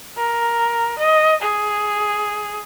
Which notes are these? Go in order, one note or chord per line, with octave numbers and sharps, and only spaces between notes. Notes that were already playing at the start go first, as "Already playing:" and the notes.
A#4
D#5
G#4